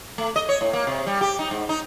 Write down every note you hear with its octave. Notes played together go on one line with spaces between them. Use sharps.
A3
D#5
C#5
A2
A#3
C3
G3
G4
D#4
G#2
D#4